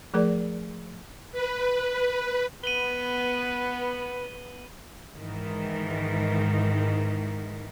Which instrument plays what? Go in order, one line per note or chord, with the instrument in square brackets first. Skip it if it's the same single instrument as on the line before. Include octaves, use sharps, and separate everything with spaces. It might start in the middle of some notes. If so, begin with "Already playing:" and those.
[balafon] F3 A3 G#4 A#4 D5
[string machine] B4
[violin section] B3 [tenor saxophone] B4 [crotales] D#7 F#7 G7
[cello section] G#2 D#3 E3